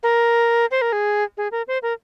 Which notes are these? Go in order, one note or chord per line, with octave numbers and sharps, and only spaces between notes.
A#4
C5
A#4
G#4
G#4
A#4
C5
A#4